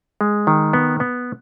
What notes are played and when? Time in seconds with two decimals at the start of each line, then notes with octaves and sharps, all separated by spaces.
0.21 G#3
0.47 D#3
0.73 B3
1.00 B3